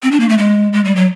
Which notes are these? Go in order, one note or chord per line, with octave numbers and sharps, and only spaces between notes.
C4
D4
A#3
A3
G#3
G#3
G3
F#3